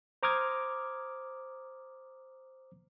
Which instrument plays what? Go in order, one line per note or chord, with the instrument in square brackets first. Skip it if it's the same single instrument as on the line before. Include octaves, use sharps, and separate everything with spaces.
[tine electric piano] C5 A#5 D6 D#6 F6 G#6